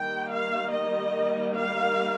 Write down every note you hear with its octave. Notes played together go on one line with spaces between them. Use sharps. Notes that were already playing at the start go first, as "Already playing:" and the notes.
Already playing: D#3 G3 A#3 G5
F5
D#5
F5